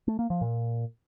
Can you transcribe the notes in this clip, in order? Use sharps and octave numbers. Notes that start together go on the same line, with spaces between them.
A3
A#3
F3
A#2